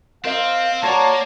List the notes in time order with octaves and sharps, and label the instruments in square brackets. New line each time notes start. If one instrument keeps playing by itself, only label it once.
[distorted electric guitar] C4 [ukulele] A#4 D#5 [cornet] F5
[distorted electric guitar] A#3 [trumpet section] F#4 A5 [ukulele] C#5 A#5 [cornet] D5